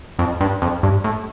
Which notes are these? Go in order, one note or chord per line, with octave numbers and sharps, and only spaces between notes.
F2
G2
F2
G2
A2